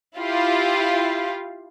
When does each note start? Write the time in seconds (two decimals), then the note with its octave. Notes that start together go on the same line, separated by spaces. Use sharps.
0.18 E4 F4 G4 F5